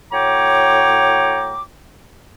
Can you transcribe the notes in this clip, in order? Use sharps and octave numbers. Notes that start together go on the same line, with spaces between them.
A2 F#4 C#5 G5 A#5 D6